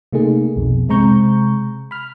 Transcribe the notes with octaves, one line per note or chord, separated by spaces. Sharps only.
C3 A3 A#3 D#4 G#4
B1 F2 B2
C3 G#3 C4 A#5 C#6 G6
B5 F6